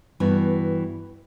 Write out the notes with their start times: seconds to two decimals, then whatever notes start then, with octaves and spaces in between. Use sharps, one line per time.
0.20 G2 E3 B3 F#4